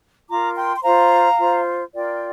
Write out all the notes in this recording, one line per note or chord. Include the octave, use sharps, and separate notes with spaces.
F4 A#4 A#5 D6
G5 C6
C6
F4 C5 F5 A#5
F4 C5
F4 A#4 D5 G5